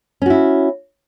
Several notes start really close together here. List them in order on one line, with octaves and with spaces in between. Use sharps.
C#4 F#4 E4